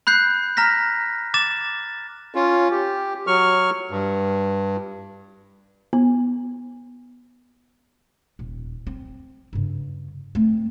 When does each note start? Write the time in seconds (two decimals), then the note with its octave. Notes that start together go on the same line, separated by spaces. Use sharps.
0.07 B5 F#6 G6 C7
0.57 A#5 F6 A#6 B6
1.34 D6 A6 E7
2.35 C#4 F4
2.71 G4
3.27 F#3 C#6 F6
3.91 G2
5.93 B3
8.39 D#1
8.87 C4
9.53 G2 C#3
10.35 A3 C4